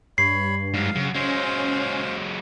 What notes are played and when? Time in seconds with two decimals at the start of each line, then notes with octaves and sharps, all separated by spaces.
0.18 G2 C#5 B5 C7
0.74 G#2 F#3 F5
0.96 F#2 C#3
1.15 F#3 G#3 C#4 C5 F5